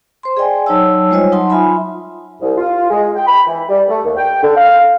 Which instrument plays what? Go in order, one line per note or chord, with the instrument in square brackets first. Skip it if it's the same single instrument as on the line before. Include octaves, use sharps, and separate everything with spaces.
[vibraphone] C5 C6
G#4 D5 D#5 G5 G#5
F#3 D#4 C#5 A5 E6
G3 G#3 F4 C5 C#5 D#5
F#3 D#4 F#5 A5 C6 D#6
F4 E5 G#5 B5
[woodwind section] C2
F4
G#3
G5
B5
E3
G3
A3
D#2
G5
D3
F5